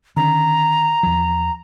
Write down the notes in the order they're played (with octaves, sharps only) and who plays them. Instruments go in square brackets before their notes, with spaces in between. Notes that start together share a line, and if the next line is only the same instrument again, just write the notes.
[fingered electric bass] D3 D#3 C#4 [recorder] A#5
[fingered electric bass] E2 F3